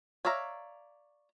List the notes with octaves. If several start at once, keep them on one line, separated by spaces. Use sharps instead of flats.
C#5 D5 E5 F5 A#5